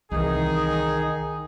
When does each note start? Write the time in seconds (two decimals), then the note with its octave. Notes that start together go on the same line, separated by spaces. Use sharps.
0.12 C2 D#3 E3 D#4 G#4